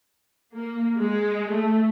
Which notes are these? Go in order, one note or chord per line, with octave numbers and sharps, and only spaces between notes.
A#3
G#3
A3